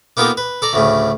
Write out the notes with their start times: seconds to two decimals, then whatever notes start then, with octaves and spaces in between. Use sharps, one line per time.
0.17 A#3 B3 D#4 F4 G4 A4
0.37 B4
0.62 A4 D5 A#5
0.73 D2 A2 C#3